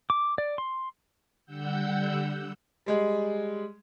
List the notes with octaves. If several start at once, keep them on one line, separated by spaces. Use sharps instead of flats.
D6
D5
C6
D3 G3 F#5 E6 G6
G3 G#3 G#4